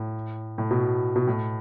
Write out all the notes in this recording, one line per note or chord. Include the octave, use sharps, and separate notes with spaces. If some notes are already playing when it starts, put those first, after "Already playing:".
Already playing: A2
A2
B2
B2
A2